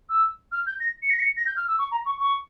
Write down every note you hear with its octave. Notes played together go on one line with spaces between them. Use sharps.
E6
F6
G6
A#6
C#7
A#6
C#7
A#6
G6
F6
E6
C#6
A#5
C#6
C#6